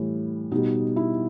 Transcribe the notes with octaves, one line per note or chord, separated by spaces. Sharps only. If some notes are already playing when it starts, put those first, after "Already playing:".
Already playing: A2 E3 G3
B2 G3 D#4
E4